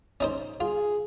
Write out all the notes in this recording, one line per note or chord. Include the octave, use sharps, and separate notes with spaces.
C#4 D#4 C5
F4 G#4